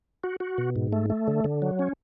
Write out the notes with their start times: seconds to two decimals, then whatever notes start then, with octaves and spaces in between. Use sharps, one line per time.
0.24 F#4
0.40 F#4
0.58 B2
0.76 G#2
0.93 A3
1.10 A3
1.27 D3
1.44 D3
1.62 F#3
1.79 C#4